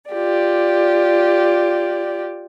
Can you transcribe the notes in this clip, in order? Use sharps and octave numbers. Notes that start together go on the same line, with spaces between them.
F4 G4 D5